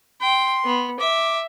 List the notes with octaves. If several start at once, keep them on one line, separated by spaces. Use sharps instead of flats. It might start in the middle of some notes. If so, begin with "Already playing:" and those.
G5 C6
B3
E5 D6